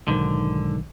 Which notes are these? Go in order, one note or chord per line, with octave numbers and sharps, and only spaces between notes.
B1 G#2 D3 D#3